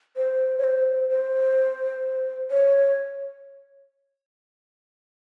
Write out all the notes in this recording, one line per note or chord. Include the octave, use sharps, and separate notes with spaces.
C5
C#5
C5
C5
C#5